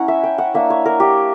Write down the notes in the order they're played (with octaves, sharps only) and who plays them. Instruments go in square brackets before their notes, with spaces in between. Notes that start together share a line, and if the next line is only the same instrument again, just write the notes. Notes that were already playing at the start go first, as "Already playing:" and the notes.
Already playing: [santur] C#4 E4 F#5 A#5
E5
G5
F#5
A#3 D4 E5
C#5
A#4
G4